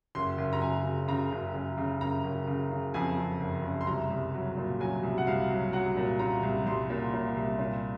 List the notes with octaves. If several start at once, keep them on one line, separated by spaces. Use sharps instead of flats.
F#1 C6
F#1
A#5
F#1 G#5
C#3
C#3 A#5
F#1
F#1
C#3
F#1 A#5
F#1
C#3
C#3
F2 G#5
F2
F#1
F#1
C6
C2 A#5
C2
F#3
A#2
F#3 G#5
C2
F#5
C2 F5
F#3
F#3 F#5
A#2
A#2 A#5
C2
C2 C6
A#2
A#2
C2
A#2